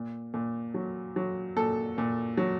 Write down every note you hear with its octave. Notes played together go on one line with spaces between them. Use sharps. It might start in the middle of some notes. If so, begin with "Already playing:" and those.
Already playing: A#2
A#2
F#3
F#3
A#2 A4
A#2
F#3